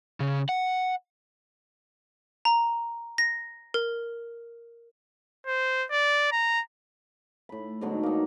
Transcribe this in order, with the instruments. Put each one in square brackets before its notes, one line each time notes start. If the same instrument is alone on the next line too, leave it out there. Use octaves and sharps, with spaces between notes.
[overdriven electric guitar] C#3
F#5
[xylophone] A#5
A#6
A#4
[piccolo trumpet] C5
D5
A#5
[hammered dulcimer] A2 B5
G#2 B2 D3 F#3
A#3 D#4